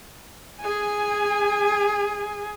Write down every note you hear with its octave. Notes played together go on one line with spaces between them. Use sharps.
G#4 G#5